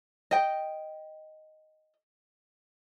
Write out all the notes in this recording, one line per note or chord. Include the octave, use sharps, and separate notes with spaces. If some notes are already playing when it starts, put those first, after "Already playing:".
D#5 G5